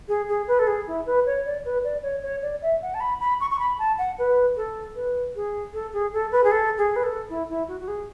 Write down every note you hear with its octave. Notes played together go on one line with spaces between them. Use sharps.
G#4
G#4
B4
A4
G#4
E4
B4
C#5
D5
B4
D5
C#5
C#5
D5
E5
F#5
A5
B5
B5
C#6
C#6
B5
A5
F#5
B4
A4
B4
G#4
A4
G#4
A4
B4
G#4
A4
G#4
B4
A4
E4
E4
F#4
F#4
G#4